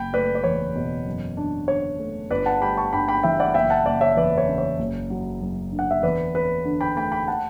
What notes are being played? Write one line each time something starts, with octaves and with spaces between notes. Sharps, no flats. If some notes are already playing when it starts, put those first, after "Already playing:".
Already playing: F#1 G5 B5
A3 B4 D5
D5
E2 C#5
B2
F#2
D4
D3 C#5
A3
G1 B4 D5
F#5 A5
G3 G5 B5
A5 C#6
G2 G5 B5
G5 B5
E3 E5 G5
D5 F#5
F#1 E5 G5
F#5 A5
F#1 D5 F#5
C#5 E5
E2 B4 D5
C#5
C#3
C#5
F#1
F#3
F#2
D3
F#5
E5
E2 B4 D5
C#4 B4
D3
G5 B5
A3 G5 B5
G5 B5
F#5 A5